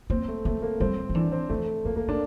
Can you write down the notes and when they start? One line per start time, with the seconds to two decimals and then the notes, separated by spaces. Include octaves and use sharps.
0.10 A#3 C4
0.28 A3
0.45 A3 A#3
0.62 A#3
0.80 G3 C4
1.09 F3
1.15 E3 D4
1.32 C4
1.49 F2 A3
1.85 F2 A#3
1.96 A2 A#3
2.08 A#2 D4